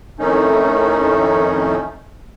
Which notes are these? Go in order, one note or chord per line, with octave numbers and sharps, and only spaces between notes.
F2 A2 D#3 A3 C#4 D#4